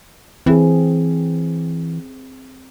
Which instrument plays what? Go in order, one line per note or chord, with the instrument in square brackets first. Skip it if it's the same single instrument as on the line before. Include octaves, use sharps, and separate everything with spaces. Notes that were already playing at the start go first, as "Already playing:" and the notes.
[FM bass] E3 [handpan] C4 G#4